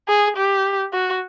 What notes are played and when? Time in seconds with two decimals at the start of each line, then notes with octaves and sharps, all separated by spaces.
0.08 G#4
0.37 G4
0.93 F#4